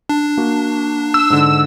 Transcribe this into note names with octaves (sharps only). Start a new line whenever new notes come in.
D4 A5
A#3 F#4
E6
G#2 D3